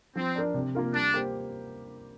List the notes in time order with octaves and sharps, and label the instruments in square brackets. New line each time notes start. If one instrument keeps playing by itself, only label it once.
[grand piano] F3 [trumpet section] C4
[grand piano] D4 A#4 D5
C3
A#3 F4 A#4
[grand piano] G3 [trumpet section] D4
[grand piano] A#3 G4 C5